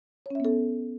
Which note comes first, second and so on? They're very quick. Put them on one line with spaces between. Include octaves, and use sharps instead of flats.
C#5 C#4 E5 B3 A4